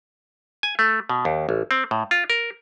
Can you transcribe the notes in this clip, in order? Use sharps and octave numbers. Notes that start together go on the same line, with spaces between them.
G#5
A3
B2
D#2
A1
C4
A2
F4
A#4